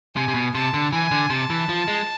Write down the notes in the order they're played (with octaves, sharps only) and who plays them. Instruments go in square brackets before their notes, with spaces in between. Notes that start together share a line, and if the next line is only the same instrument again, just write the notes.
[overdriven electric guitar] C3 [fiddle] G#5
[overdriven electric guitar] C3
B2
[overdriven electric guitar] C3 [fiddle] A5
[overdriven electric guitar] D3
[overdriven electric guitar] E3 [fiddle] G#5
[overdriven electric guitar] D3
[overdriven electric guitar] C3 [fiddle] A5
[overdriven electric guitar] E3
F3
G#3